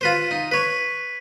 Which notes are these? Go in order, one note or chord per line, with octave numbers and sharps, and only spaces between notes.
F4 B4 C5
D#4
B4 C#5